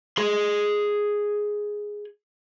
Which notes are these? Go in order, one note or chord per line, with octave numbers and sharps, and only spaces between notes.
G#4 C6